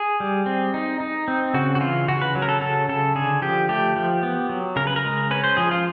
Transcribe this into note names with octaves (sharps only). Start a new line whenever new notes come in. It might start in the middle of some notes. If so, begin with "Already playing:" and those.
Already playing: G#4
G3
C4
D#4
D#4
C4
C#3 F#4
F#4
E3 F4
C#3 F#4
B4
F#3
A#4
A4
C#3 A4
C#3 A4
D3 G#4
F3 G4
A3 G4
F3
B3
F#3
C#3 A#4
B4
A#4
G#3
C#4 B4
C5
F3 G#4
F4